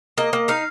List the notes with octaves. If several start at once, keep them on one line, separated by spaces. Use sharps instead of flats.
A#3 D#5
A#3
D#4 F5